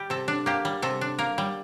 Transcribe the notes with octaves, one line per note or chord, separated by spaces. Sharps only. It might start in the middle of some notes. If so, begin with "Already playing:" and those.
Already playing: G3 G4
C3 A4
D4
A#3 G4
G3
C3 A4
D4
A#3 A#4
G3